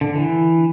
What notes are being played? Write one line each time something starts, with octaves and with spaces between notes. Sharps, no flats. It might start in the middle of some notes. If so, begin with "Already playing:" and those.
D3
E3